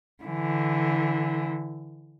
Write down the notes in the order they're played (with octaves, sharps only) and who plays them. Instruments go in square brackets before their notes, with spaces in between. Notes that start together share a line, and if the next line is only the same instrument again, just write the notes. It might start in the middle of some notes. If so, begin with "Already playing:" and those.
[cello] D3 E3